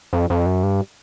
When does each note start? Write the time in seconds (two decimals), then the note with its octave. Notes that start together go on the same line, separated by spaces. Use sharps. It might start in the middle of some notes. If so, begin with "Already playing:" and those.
0.13 F2
0.30 F2
0.46 F#2
0.63 G2